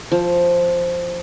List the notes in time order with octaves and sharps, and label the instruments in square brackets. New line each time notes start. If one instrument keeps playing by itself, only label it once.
[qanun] F3